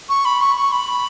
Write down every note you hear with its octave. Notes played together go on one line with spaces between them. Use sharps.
C#6
B5
C#6
C#6
B5